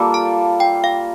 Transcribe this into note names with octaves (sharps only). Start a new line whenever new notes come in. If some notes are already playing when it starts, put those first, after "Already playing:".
Already playing: G3 A#3 F4 A4
A5
G5
F5